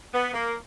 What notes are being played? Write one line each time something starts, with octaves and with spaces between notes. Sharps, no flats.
B3
A#3